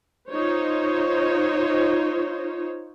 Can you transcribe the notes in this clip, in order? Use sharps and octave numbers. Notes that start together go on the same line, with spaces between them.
D#4 F4 C5 C#5